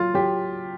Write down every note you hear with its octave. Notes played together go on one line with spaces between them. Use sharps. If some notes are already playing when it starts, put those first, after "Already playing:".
Already playing: F#3 F4
F#3 G4